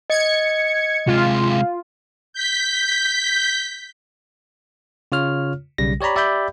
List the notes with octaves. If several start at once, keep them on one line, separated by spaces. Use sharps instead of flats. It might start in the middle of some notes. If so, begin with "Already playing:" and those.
D#5 G#6 C#7
C3 G#3 F4
G6 B6
C#3 F4 C#5 F6
B1 C#3 G3 A#6
G4 C#5 D5 A#5 B5
G4 D5 E5 G5 B5 G6